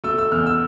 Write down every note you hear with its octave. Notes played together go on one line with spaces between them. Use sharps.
A3 E6
E6
E2 F6
E6